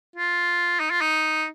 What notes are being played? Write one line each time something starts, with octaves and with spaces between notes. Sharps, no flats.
F4
D#4
F4
D#4